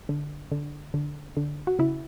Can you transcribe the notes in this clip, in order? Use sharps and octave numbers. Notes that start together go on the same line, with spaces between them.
D3
D3
D3
D3
F#4
C#3 E4